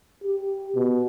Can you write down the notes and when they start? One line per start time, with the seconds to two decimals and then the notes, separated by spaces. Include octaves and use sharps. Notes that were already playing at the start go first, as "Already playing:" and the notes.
0.24 G4
0.76 B2